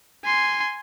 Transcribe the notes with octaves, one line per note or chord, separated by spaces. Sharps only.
G#5 C6